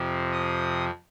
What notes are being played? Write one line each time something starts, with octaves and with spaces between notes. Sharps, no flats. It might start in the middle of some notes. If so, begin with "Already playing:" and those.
Already playing: F2 C3 F3
D#6